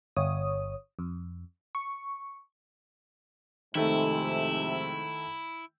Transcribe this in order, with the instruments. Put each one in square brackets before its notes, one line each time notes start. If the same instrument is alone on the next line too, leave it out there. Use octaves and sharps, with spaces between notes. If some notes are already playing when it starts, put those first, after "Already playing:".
[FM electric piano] G1 C#5 D#6
F2
C#6
[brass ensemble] F2 G#2 C3 [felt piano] D#3 A3 [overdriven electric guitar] E4